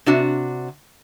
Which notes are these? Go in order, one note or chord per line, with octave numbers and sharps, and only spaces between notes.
C3 D4 F#4